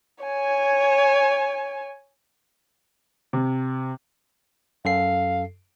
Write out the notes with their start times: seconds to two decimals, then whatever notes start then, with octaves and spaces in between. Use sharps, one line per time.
0.24 C#5 G#5
3.33 C3
4.85 F#2 A4 F5 C7